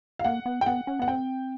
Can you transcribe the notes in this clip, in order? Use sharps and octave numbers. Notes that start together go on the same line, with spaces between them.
F5
A#3 F#5
B3
G5
B3 F#5
C#4
B3 F#5
C4 G5